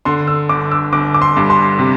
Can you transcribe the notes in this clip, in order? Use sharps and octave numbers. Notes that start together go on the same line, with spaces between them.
D3 C6
E6
G1 D6
E6
G1 D6
D6
C6
G2
C6
C3